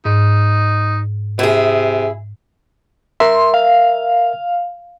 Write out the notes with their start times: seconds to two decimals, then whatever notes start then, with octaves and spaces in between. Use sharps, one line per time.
0.05 G#2 D#4
1.39 C3 E4 G#4
3.20 A#4 E5 C6
3.54 F5